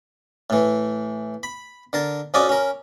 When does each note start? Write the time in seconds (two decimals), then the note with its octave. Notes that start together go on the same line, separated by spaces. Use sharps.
0.50 A2 E3
1.43 B5
1.93 D3 A#4 A5
2.34 F2 C#4 F#4 D5 D6 D#6
2.49 C#4 A#4